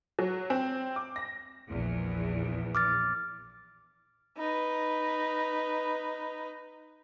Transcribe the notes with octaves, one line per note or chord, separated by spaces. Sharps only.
F#3
C4
D6
A#6
A#1 E2
D6 F6 A6
D#4 B4